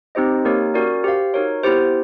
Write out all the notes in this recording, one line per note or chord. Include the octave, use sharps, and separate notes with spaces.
C4 D#4 G4 C5 D#5
A#3 D#4 G4 A#4 C#5
C#4 F#4 A#4 D5
G4 C5 F5
D#4 F#4 A#4 C#5
B3 E4 G4 C5